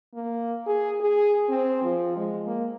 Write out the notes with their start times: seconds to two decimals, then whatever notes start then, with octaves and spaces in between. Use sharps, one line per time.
0.15 A#3
0.66 G#4
1.01 G#4
1.49 C4
1.83 F3
2.17 G#3
2.47 A#3